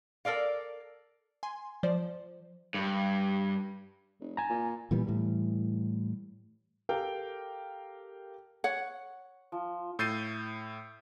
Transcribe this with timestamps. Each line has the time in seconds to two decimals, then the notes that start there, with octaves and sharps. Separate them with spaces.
0.25 A4 A#4 D5 F5
1.43 G#5 C6
1.83 F3 C5 D5
2.74 G2
4.20 F1
4.37 G#5 A#5
4.50 A#2
4.91 A#2 E3 G3 B3
5.07 A2 E3 G3
6.89 G4 A4 A#4 F5 G5
8.64 C#5 F#5
9.52 F3
9.99 A2 E6 G6 A6 C7 D#7